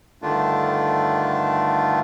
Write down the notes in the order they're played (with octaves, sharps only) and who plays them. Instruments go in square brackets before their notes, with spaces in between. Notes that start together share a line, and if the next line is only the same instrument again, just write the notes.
[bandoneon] G2 D3 D#3 A3 D4 F4